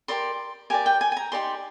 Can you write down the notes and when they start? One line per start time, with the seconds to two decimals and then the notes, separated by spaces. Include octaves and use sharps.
0.08 G4 A#4 D5 C6
0.70 G4 A#4 D5 G#5
0.86 G5
1.01 G#5
1.12 G#5
1.17 A#5
1.32 D#4 G4 A#4 D5 C6